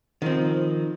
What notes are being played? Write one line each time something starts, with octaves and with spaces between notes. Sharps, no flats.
D#3 F3 C4